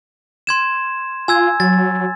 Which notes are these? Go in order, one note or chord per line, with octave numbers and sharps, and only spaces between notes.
C6 G#6 E7
F4 G#5 E6 G#6
F#3 A6